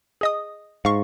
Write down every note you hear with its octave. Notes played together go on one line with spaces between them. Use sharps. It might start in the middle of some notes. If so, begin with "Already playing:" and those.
G#4 D#5 D#6
G#2 F5 C#6